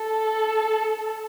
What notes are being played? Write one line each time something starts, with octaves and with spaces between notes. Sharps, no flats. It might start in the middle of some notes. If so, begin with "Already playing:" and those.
Already playing: A4